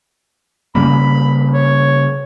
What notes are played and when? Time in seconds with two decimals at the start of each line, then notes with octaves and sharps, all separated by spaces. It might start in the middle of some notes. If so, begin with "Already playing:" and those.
0.75 C#3 G3 A#3 B5
1.54 C#5